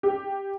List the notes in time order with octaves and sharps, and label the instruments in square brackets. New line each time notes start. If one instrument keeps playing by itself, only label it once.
[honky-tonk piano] G4